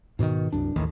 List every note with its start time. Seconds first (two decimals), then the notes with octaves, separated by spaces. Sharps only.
0.19 G#2 B2 D3 D#3
0.52 C2 F#2 D4
0.76 A1 D#2 D#3